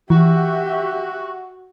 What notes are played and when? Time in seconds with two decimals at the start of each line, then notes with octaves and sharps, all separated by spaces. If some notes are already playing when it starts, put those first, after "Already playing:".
0.10 E3 F#4 G4 E5